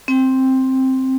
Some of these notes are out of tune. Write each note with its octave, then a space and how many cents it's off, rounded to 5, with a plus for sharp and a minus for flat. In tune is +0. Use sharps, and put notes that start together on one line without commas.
C4 +5